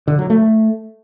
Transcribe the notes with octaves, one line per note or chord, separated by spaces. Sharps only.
D3
F#3
A3